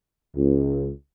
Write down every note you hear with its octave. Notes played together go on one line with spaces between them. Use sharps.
C#2